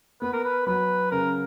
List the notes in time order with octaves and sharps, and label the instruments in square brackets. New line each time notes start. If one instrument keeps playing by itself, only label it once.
[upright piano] B3 [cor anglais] B4
[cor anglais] A#4
B4
[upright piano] F#3 [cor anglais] B4
[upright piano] C#3 [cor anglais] A#4